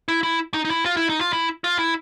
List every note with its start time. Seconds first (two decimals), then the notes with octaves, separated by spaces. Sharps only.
0.08 E4
0.23 E4
0.54 D#4
0.65 D#4
0.70 E4
0.86 F4
0.97 E4
1.09 D#4
1.21 F4
1.33 E4
1.64 F4
1.79 E4